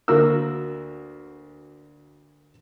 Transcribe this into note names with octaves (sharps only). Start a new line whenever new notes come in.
D2 A#3 F#4 A#4 E6